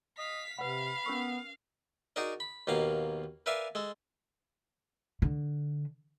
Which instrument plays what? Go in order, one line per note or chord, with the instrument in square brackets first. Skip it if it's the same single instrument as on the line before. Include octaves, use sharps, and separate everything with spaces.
[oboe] D#5 [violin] F5 B6
[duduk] C3 [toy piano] B4 F#5 [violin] F5 [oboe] B5
[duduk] B3 [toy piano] C#4 A#4 C#6
[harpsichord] D#4 F#4 G#4 A#4 D5
B5
D#2 B2 A#3 F5
A#4 B4 D5 E5 F5 G#5
G#3 A4
[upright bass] D3